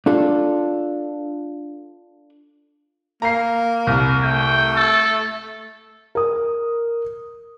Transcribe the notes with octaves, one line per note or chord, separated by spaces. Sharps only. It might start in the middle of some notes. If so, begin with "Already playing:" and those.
D4 F4 A4
A#3 A#5 C7
C2 A#4
A3 G5
A4
A#4 D#6